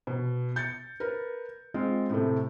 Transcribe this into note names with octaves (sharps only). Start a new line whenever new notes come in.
B2
G6 A6 C#7
A#4 B4
G#3 C4 F4
A2 C3 A3